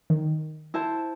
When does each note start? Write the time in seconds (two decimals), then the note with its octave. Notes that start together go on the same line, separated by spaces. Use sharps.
0.10 D#3
0.74 E4 C5 A5